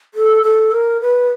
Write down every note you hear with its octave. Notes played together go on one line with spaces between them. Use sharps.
A4
A4
A#4
B4